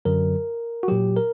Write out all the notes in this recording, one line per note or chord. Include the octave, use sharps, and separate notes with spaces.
F#2 D3 F#3 A#4
F#4
A#2 F#3 G4
A#4